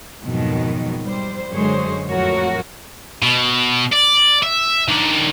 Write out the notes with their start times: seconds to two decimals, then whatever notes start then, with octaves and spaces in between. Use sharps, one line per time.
0.24 F2 G#2 B2 D#3 F#3
1.02 G3 C5
1.52 F#2 D3 G#3 G#4 C5 C#5
2.06 F2 A2 F#3 F#4 A#4 C#5
3.22 B2
3.92 D5
4.43 E5
4.88 D#3 D4